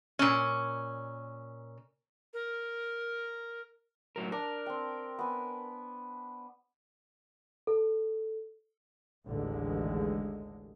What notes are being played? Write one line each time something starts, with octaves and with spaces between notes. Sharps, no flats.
A#2 C#4
A#4
A2 F#3 A#4
D4 A#4
C4 G5
B3 G#5
A4
A1 D#2 D3 G#3